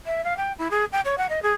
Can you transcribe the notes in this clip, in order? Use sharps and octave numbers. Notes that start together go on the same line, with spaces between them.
E5
F5
G5
E4
G#4
G5
C#5
F#5
D#5
G#4